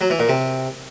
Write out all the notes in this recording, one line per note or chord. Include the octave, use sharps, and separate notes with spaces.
F#3
E3
A#2
C3